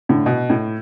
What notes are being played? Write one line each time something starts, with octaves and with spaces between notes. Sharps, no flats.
A2 D3
B2
A2